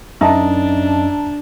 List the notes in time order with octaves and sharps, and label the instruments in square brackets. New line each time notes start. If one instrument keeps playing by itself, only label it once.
[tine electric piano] F#2 [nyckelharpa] D4 [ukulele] D#4 [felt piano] E5 A5 A#5